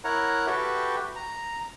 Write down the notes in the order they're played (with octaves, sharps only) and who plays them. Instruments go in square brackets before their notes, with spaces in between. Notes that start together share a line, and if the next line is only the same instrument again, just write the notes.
[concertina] E4 A#4 C#5 F#5 A#5
F#4 G4 A4 B4 E5 G5
A#5